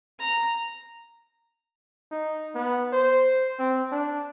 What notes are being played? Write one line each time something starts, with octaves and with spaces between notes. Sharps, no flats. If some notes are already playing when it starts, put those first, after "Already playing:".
A#5
D#4
B3
C5
C4
D4